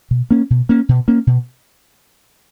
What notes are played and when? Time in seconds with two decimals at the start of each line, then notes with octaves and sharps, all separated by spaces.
0.11 B2
0.31 A#3 C#4
0.50 B2
0.69 A#3 C#4
0.89 B2
1.08 A#3 C#4
1.27 B2